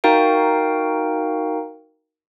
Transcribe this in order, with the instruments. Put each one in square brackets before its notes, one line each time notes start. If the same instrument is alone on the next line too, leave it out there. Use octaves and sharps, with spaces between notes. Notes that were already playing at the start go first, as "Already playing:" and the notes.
[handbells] D#4 F#4 A#4 F5 G5